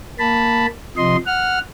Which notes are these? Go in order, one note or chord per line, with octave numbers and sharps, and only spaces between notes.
A#3 A5 B5
C3 F3 D#5 C6
F#5 F6